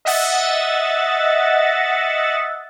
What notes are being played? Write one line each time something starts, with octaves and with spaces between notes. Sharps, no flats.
D#5 E5 F#5 A6